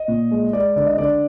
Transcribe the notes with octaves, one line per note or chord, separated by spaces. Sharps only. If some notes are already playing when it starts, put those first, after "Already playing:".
Already playing: D#5
A#2
G#3
G#3 D5
D3 D5
D#5
D3 D5